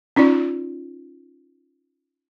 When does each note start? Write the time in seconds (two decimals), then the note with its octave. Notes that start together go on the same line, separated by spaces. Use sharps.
0.16 C#4 D#4 F4 D5